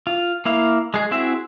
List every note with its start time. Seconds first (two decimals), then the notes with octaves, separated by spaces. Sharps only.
0.07 F4
0.45 A#3 E4 F5
0.94 G#3 G#4
1.11 C4 E4 F#4 G#4 E5